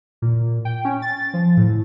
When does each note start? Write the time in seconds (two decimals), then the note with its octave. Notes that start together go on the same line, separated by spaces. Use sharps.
0.22 A#2
0.65 G5
0.85 C#4
1.02 A6
1.34 F3
1.57 A2